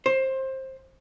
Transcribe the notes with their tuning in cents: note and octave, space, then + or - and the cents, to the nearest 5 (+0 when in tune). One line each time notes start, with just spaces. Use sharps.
C5 +20